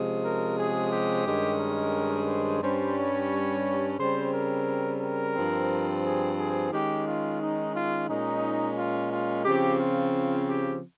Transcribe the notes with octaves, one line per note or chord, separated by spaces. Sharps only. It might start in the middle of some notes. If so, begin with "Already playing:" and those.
Already playing: C3 F3 G#3 C#4
A#4
G#4
G4
G2 D#3 G#3 C#4
A#4
C5
G2 G3 C#4 C5
C#5
C#3 G3 C4 C5
A#4
A#4
G2 F3 C4
G#4
G#4
D#3 G#3 C#4 G4
F4
D#4
F4
A#2 G#3 C#4 D#4
F4
F4
C#3 F3 C4 G4
F4
G4